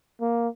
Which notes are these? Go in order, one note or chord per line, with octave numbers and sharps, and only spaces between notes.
A#3